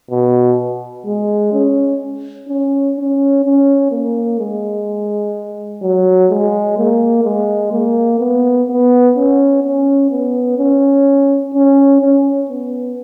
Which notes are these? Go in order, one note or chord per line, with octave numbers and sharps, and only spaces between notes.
B2
G#3
C#4
C#4
C#4
C#4
A#3
G#3
F#3
G#3
A#3
G#3
A#3
B3
B3
C#4
C#4
B3
C#4
C#4
C#4
B3